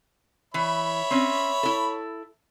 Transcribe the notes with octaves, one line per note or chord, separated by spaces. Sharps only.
E3 C#5 E5 B5
C4 C#4
E4 A4